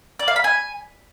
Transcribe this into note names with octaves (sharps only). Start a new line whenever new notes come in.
D5
F5
B5
G#5